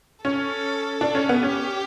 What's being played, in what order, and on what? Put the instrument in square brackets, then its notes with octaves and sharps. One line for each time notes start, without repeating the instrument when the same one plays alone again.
[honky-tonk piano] C#4 [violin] A4
[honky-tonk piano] D4
C#4
B3
[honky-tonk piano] C#4 [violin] G4